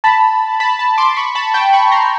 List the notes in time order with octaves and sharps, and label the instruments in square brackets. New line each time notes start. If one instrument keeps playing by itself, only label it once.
[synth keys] A5 B5
A5 B5
A5 B5
C6 D6
B5 C#6
A5 B5
G5 A5
B5 C#6
A#5 C6